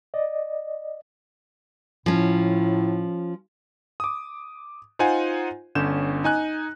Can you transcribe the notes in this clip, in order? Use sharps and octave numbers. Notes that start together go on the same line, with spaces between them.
D5 D#5
A2 F3 C#4
D6 D#6
D#4 F4 C5 F#5 G#5
G1 D3 C#4 G6 E7
D#4 G#5 F#6